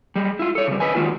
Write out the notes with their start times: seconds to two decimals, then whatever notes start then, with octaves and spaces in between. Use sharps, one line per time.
0.16 G3 G#3
0.39 E4 F4
0.55 A4 C#5
0.67 C#3 G3
0.80 B4 D#5 G#5
0.95 D#3 G#3 F4 F#4